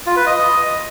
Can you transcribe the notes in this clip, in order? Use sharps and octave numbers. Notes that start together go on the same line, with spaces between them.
F4
B4
D#5